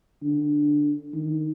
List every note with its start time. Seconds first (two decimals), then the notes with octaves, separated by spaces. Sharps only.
0.22 D3
1.13 D#3